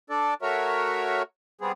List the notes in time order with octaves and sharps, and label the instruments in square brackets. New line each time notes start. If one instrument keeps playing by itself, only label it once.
[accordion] D4 A4 D5
A3 F#4 A#4 C#5 E5
G3 B3 C4 G#4